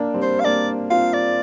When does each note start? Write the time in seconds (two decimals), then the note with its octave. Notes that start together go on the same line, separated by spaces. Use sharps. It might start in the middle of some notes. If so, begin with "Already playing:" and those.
Already playing: A#3 D4
0.14 G3 C4
0.22 C5
0.40 F5
0.44 A#3 D4 D5
0.90 C4 F4 F5
1.13 D5